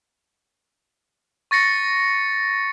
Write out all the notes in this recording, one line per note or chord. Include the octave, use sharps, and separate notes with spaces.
C#6 A6 A#6 C#7